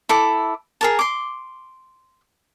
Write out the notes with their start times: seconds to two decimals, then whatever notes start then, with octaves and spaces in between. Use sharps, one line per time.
0.09 E4 A4 D6
0.81 G#4 A#4 A5
0.99 C6 D6